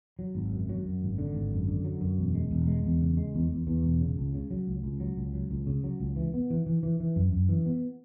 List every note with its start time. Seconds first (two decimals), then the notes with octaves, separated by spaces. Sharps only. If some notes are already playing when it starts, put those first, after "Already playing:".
0.19 F#3
0.35 G#1
0.52 F#2
0.69 F#3
0.85 F#2
1.02 G#1
1.18 D3
1.34 G#1
1.52 F#2
1.68 D3
1.84 F#3
2.01 F#2
2.18 E1
2.35 G#3
2.51 E1
2.67 G#3
2.84 E2
3.01 C#3
3.17 G#3
3.35 E2
3.51 E2
3.67 E2
3.84 E1
4.01 C#3
4.17 C#2
4.35 C#3
4.51 F#3
4.67 C#2
4.84 C#2
5.00 F#3
5.17 C#2
5.34 F#3
5.51 C#2
5.67 C#3
5.84 F#3
6.00 C#2
6.16 E3
6.34 B3
6.50 E3
6.66 E3
6.83 E3
7.00 E3
7.16 F#2
7.33 F#2
7.49 E3
7.66 B3